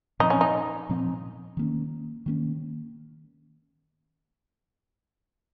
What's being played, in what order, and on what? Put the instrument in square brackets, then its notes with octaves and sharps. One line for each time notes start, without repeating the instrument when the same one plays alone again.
[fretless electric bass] A#2 F3 C4 [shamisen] D#4
[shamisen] C#4
D#4
[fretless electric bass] A#2 F3 C4
D#3 A#3 C#4
D#3 A#3 C#4